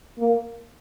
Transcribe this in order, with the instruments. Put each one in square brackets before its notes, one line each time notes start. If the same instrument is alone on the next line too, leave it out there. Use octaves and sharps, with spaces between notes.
[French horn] A#3